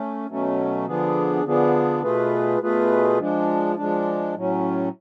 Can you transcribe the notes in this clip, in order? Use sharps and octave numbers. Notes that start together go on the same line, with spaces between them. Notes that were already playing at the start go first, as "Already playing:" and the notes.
Already playing: A3 C#4
B2 F#3 A3 C#4
D3 F3 B3 D4 G#4
D3 F3 B3 D4 G#4
B2 A3 F4 G#4 B4
B2 A3 F4 G#4 B4
F3 G#3 D4
F3 G#3 D4
A2 F#3 C#4